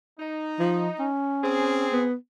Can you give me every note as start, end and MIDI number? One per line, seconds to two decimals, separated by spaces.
0.20 1.06 63
0.59 0.89 53
0.99 1.87 61
1.43 2.04 60
1.43 2.04 68
1.93 2.15 59